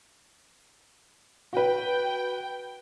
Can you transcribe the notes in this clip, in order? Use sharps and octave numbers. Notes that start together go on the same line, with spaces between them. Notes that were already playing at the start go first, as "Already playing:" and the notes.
F#4 B4 G5